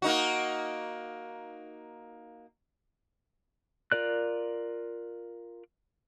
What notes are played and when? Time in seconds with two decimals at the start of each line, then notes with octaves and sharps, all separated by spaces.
0.02 A#3 D#4 F#4
3.92 F4 A#4 D5 F#6